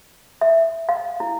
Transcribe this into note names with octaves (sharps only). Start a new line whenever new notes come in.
E5
F5
E4